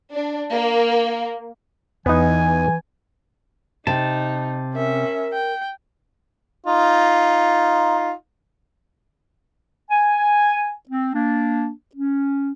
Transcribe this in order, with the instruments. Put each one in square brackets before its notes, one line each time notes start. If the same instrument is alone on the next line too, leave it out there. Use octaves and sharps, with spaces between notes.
[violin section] D4
A#3
[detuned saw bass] E2 [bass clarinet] E3 [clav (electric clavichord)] B3 D#4 [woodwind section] G#5
[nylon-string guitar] C3 [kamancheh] D#4 [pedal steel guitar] A5
[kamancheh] C#4 E5 [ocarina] A#4
[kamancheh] G5
[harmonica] D#4 F4
[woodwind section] G#5
C4
A#3 D4
C#4